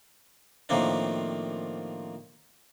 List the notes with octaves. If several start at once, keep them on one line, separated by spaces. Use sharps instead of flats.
A2 D#3 F3 A#3 C4 D4